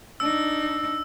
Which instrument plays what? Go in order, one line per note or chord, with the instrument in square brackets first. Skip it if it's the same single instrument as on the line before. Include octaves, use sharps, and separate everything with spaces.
[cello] D4 D#4 [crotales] E6